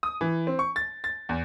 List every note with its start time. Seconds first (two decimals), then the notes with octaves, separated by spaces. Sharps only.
0.03 D#6
0.21 E3
0.47 C4
0.59 C#6
0.76 A6
1.04 A6
1.29 E2